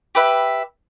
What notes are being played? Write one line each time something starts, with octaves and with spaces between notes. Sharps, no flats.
G4 B4 E5